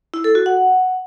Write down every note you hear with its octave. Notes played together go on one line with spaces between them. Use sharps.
E4
A4
F#4
F#5